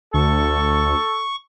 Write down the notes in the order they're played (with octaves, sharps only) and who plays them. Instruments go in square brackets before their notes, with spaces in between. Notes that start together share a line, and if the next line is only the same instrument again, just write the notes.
[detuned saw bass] D2 [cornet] A4 [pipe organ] C#6